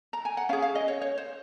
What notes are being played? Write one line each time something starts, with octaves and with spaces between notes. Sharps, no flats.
A#5
G#5
F#5
C#4 G#4 F5
F5
D#5
C#5
C#5
C5